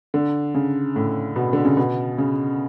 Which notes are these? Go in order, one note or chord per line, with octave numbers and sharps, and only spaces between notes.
D3
C#3
A2
B2
D3
C#3
B2
C#3